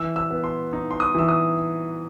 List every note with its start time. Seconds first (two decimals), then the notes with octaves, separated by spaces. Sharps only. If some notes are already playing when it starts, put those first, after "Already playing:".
Already playing: E3 E6
0.16 E6
0.30 B3
0.44 C6
0.73 D#4
0.91 C6
1.00 D#6
1.15 E3 E6
1.29 D#6